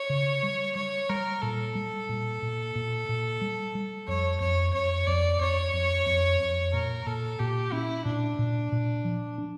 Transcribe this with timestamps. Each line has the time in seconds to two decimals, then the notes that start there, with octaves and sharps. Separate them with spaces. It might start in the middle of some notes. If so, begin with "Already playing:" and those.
Already playing: C#5
0.10 C#3
0.43 G3
0.76 G3 C#5
1.09 G3 A#4
1.42 A#2 A4
1.75 G3
2.09 A#2
2.42 A#2
2.75 A#2
3.09 A#2
3.42 G3
3.75 G3
4.08 F2 C#5
4.41 F2 C#5
4.74 F2 C#5
5.07 F2 D5
5.41 F2 C#5
5.74 F2
6.06 F2
6.40 F2
6.73 A#2 A#4
7.06 A#2 A4
7.39 A#2 G4
7.72 C#4 E4
8.05 A#2 D4
8.39 A#2
8.72 A#2
9.05 F3
9.38 D4